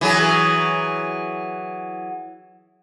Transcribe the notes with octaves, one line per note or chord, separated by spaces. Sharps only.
E3 F#3 G#4